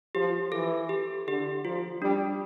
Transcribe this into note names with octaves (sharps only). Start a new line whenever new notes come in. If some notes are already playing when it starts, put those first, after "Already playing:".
F3 G4
E3 A4
G4
D3 G4
F3 F4
G3 D4